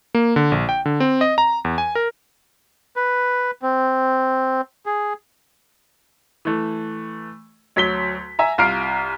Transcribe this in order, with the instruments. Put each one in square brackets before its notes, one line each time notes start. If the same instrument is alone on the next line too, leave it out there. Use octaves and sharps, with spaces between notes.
[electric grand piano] A#3
D3
A#1
G5
D3
C4
D#5
A#5
E2
G#5
A#4
[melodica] B4
C4
G#4
[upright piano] E3 A3
D2 F#3 B6 G7
E5 G#5 A#5
C2 F4 A#5 F6 C7 D7